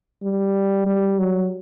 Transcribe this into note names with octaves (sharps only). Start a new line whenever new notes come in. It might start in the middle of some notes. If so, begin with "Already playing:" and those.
G3
G3
F#3